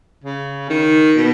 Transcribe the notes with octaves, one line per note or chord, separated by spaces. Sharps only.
C#3
D#3
B2